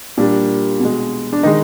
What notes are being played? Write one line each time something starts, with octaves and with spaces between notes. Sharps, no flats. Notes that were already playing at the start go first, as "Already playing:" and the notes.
A#2 G3 A#3 D4
B2 G#3
D4
D#3 G#3 D#4